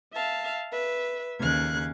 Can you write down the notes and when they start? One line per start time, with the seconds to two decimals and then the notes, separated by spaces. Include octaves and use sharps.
0.13 E5 F5 A5
0.71 B4 E5
1.40 D#2 C#3 F5 F#6 G#6